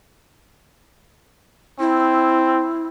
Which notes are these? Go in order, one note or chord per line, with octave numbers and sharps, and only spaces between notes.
C4 E4